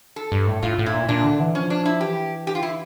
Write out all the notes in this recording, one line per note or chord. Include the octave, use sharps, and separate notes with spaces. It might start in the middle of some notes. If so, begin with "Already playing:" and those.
A4
G2
A2
A2 F4
A2
E4
A#2
A#2 D4
D3
E3
F3 C#4
D4
E4
E3 G4
G4
F4
E4